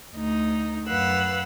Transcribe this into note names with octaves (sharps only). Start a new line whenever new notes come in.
D2 D#4
F#2 B4 F5 F#5 E6 F#6